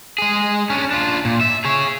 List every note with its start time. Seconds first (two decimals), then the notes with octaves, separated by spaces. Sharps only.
0.18 G#3 G#4
0.70 C#4 D4
0.91 D4 F4
1.25 A#2
1.41 E5
1.65 G#4 C#5